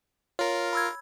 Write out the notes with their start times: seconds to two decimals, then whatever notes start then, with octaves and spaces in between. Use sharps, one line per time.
0.39 F4 A#4 C#5
0.73 B5 E6 G#6